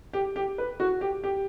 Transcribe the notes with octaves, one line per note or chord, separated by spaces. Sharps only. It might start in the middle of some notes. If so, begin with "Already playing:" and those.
G4
G4
B4
F#4
G4
G4